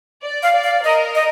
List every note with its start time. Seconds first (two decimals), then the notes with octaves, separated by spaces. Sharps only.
0.23 D5
0.43 F5
0.54 D5
0.64 F5
0.84 A#4 D#5
1.15 D#5